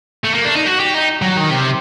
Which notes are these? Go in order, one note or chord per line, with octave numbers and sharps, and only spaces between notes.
A3
A#3
D4
D#4
F#4
G4
D#4
F#3
D#3
C3